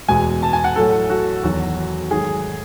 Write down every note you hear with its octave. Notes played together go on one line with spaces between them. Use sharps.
E2 B2 G#3 G#5
A5
G#5
F#5
A2 F#3 A3 A4
F#4
E2 D#3 F#3 F#4
G#2 D#3 F#3 A3 G#4